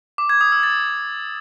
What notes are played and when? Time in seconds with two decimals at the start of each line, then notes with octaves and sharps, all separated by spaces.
0.18 D6
0.29 G#6
0.41 D#6
0.52 E6
0.63 A6